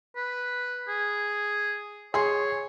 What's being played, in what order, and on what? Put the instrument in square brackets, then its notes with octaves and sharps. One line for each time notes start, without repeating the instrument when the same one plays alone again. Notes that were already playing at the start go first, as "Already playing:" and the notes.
[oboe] B4
G#4
[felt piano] G#4 C6 [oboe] C#5